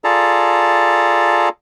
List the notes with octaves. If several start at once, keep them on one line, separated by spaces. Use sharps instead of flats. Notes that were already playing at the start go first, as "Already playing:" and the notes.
F4 G#4 A4 D5 A5 A#5